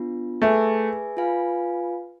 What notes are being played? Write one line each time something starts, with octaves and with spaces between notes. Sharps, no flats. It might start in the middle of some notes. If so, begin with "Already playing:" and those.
Already playing: B3 D4 F4
A3 G#4 B4 E5 G#5
F4 B4 F5 G#5